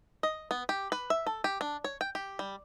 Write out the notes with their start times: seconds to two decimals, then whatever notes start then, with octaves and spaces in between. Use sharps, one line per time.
0.23 D#5
0.51 B3
0.69 G4
0.92 B4
1.10 E5
1.26 A4
1.44 G4
1.61 D4
1.84 C#5
2.01 G5
2.15 G4
2.39 G3